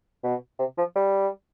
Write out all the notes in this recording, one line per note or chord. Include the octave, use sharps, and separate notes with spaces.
B2
C3
F3
G3